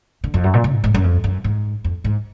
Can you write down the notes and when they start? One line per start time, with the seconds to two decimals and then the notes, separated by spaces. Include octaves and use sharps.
0.24 D3
0.34 F2
0.44 F#2
0.54 A#2
0.64 D3
0.74 G#2
0.84 G#2
0.94 F#2
1.04 F2
1.24 F#2
1.44 G#2
1.84 F2
2.04 G#2